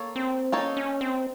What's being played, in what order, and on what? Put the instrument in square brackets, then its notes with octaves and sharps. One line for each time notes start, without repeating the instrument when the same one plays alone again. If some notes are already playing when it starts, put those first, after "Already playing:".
Already playing: [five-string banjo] A#3 A4 C#5
[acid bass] C4
[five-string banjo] A#3 D#4 A4 C#5 [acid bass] C#4
[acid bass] C#4
C4